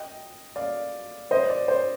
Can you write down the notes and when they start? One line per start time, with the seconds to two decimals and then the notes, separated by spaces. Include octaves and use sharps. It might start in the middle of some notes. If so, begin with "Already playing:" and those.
Already playing: D#5 G5
0.56 D5 F5
1.31 C5 D#5
1.50 D5
1.68 C5